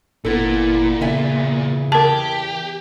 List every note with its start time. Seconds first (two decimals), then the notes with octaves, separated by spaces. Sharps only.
0.25 G1 A#2 B3 E4 A4
1.01 E2 C#3 E5 G#5
1.92 G4 A#4 A5